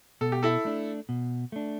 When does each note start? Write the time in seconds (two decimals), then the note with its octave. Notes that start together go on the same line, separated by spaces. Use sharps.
0.21 B2 A4
0.32 G4
0.43 E4 A4
0.65 A3 D4
1.09 B2
1.52 A3 D4